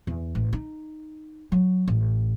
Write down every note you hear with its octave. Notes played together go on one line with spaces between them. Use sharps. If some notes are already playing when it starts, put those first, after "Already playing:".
E2
A1
D#4
F#3
A1